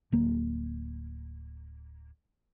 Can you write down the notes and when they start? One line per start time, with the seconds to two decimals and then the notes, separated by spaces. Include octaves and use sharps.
0.12 D1 A#3